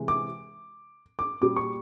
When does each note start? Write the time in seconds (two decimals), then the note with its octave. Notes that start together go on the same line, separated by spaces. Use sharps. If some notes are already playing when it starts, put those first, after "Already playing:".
Already playing: C3 E3 G#3
0.08 D6
1.19 D6
1.41 A#2 G3 D6
1.56 C#6